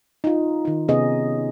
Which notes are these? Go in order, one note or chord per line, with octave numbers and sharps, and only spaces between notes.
D#4 F4
D#3 D#4
C3 B3 C#4 G#4 D#5